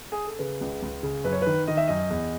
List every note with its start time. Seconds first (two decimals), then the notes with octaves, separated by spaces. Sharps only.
0.12 G#4
0.26 A4
0.39 C#3 B4
0.61 C#2
0.83 C#2
1.03 C#3
1.24 F#2 B4
1.33 C#5
1.42 D#3 B4
1.68 D#3 D#5
1.77 E5
1.88 F#2 D#5
2.10 E2